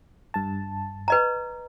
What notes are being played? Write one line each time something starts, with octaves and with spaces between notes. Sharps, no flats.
G2 A5
B4 D#5 A#5